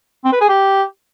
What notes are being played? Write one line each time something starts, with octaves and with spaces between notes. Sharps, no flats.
C4
B4
G#4
G4